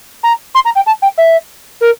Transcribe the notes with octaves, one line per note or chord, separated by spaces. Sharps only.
A#5
C6
A#5
G5
A5
G5
E5
A#4